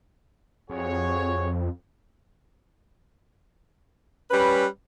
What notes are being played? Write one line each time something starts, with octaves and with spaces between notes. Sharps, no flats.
F2 F#4 G#4 C#5
G3 C#4 B4